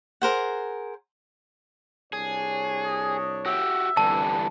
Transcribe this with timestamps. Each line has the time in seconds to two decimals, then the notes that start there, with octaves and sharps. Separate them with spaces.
0.22 G#4 A#4 C5 F#5
2.13 C2 D4 G#4 C#5
2.85 D#5
3.46 F#4 G4 E5
3.97 C2 G2 D3 E3 G3 A5